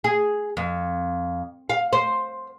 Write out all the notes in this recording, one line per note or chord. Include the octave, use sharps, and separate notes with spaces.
G#4
F2
F5
C5